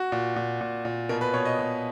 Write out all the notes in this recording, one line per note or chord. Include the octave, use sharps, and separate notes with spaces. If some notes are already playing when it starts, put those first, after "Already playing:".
Already playing: F#4
A#2
A#2
A#2
A#2
B2 A#4
B4
B2 C#5
D#5
B2